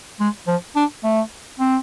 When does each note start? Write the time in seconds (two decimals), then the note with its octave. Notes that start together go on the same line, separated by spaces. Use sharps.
0.20 G#3
0.47 F3
0.76 D4
1.04 A3
1.60 C4